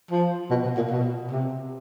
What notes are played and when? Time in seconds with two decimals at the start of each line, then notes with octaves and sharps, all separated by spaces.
0.11 F3
0.50 B2
0.64 B2
0.77 A#2
0.91 B2
1.31 C3